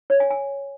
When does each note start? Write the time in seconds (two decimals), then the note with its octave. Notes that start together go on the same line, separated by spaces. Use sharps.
0.10 C#5
0.20 G#5
0.30 G#5